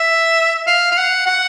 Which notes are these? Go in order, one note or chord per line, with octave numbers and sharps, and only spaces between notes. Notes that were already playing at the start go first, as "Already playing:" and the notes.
Already playing: E5
F5
F5
F#5
F#5